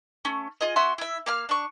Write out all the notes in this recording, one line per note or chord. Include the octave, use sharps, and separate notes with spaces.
A3 C#4
F4 G#4 D#5
C#4 F#4 E5 C6
E4 E5
A#3 F5 F6
D4 C#6